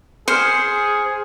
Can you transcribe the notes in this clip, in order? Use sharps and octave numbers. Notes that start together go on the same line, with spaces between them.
G#4 C5 F6 C#7